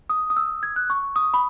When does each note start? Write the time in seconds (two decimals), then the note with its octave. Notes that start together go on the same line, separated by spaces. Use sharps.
0.10 D#6
0.30 D#6
0.37 E6
0.63 G#6
0.76 F#6
0.90 C#6
1.16 D#6
1.34 B5